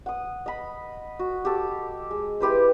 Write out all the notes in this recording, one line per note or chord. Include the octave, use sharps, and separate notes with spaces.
F#5 D#6
D#5 B5
F#4
G4 A4
G#3
E4 G4 B4 C5